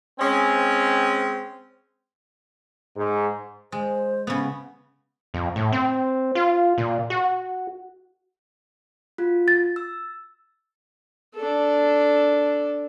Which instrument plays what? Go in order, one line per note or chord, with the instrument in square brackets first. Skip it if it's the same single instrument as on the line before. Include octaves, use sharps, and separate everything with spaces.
[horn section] G#3 C4 C#4
[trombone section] G#2
[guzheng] G#3 [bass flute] C5
[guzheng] C#3 B3
[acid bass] F2
A2
C4
F4
A#2
F#4
[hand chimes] F4 F#4
[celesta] A6
[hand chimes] E6
[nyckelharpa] D4 A4